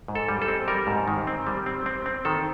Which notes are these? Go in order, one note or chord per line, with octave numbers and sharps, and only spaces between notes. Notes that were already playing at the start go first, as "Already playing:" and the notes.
G#2
A4
G3
A4
C4
G3 A#4
G#2
D#3
C4
G3
C4
C4
C4
D#3 A4